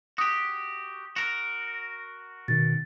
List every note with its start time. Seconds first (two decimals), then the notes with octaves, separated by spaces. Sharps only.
0.18 F#4 G4 D#6
1.16 F#4 A#4
2.48 B2 D#3 A6